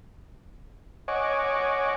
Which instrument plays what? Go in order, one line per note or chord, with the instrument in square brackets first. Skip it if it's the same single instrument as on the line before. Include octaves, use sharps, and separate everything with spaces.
[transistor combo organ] C#5 D#5 F#5 G#5 C#6 D6